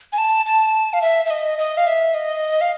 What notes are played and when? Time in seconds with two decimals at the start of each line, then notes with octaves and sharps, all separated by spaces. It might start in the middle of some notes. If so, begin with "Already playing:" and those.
0.12 G#5
0.18 A5
0.46 A5
0.93 F5
1.02 E5
1.25 E5
1.30 D#5
1.58 D#5
1.77 F5
1.87 E5
2.14 D#5
2.61 F5